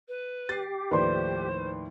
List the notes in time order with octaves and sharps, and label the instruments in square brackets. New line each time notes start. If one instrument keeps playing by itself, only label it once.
[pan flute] B4
[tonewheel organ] G4 [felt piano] A6 C7
[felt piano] D#2 A2 F3 [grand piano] B4 D5 C6 [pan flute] C5